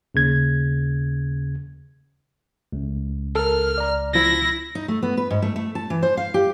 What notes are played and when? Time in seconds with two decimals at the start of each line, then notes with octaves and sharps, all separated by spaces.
0.15 D#2 C#3 G#6
2.73 C#2
3.35 A4 A#4 F6
3.78 D5 A#5
4.14 B2 F3 E4 A#6
4.75 D#4
4.88 A3
5.03 B3
5.17 B4
5.30 G#2
5.42 A3
5.56 A3
5.75 A5
5.90 E3
6.02 C5
6.17 F5
6.34 G4